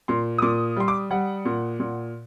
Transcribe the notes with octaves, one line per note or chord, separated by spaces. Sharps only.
A#2 C6
D#6
A#2 D6
G3 C6
D6
G3 F#5
A#2
A#2